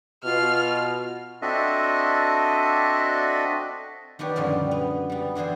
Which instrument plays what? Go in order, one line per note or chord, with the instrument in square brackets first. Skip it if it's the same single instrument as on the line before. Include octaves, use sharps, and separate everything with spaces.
[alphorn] B2 [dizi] F4 [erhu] F6
[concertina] C4 D4 F#4 A4 D#5 E5
[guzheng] D#3 B3 D4 G4 C#5
F#2 A#2 D3 F3 G3 G#3
B3
G3 B3
D3 E3 E4 G#4 C5